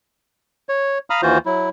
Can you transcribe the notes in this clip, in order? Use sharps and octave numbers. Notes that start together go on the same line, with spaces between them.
C#5
F5 A#5 B5 D#6 F6
D#2 E3 F4 F#4 C5
F#3 E4